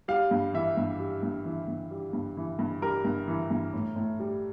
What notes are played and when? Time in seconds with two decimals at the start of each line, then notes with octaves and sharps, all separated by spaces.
0.08 G3 F5
0.31 G2
0.54 E3 E5
0.77 G2
0.99 G3
1.23 G2
1.45 E3
1.68 G2
1.91 G3
2.13 G2
2.37 E3
2.59 G2
2.82 G3 A#4
3.05 G2
3.28 E3
3.51 G2
3.74 A2
3.96 A2
4.20 G3